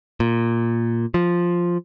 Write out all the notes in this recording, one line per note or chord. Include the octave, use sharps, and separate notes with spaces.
A#2
F3